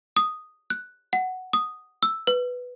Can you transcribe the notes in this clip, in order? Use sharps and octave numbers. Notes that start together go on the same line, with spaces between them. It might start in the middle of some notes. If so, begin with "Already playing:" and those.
D#6
F#6
F#5
D#6
E6
B4